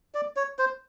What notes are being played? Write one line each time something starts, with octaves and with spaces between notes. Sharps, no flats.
D5
C#5
C5